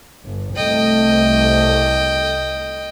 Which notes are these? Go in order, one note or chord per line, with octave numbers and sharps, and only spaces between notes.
G1
C2 A3 D#5 G5